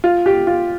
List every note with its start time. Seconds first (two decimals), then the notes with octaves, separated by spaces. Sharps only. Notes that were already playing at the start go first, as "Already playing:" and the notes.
0.04 F4
0.26 G4
0.47 F4